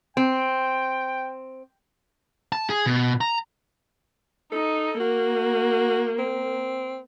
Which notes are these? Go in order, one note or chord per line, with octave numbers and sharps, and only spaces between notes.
C4 G5
A5
G#4
B2
A#5
D#4 A4
A#3 F#4
C4